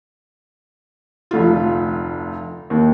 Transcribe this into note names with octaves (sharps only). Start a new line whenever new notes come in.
F1 D2 F4
D#2